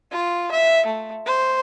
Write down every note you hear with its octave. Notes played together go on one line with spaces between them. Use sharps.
F4
E5
A3
C5